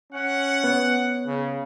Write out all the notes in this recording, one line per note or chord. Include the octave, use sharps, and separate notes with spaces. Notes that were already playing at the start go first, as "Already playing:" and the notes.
C#4 F#5
B3 C#5
C#3